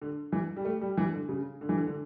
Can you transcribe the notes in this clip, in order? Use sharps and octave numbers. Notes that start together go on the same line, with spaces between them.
D3
E3
G3
A3
G3
E3
D3
C#3
D3
E3
D3
D3